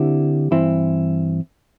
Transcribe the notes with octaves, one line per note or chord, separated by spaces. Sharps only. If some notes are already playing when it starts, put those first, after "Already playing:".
Already playing: D3 C4 E4 G4
G2 E3 C4 E4